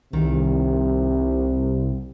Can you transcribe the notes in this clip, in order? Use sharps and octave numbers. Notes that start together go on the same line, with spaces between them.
C2 C3 D#3